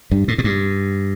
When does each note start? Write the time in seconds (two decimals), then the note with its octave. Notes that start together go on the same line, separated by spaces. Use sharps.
0.11 G2
0.28 A2
0.38 A2
0.44 G2